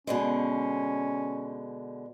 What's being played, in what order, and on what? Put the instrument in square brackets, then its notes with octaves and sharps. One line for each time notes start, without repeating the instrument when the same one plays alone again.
[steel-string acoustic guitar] B2 D3 G#3 [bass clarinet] C#4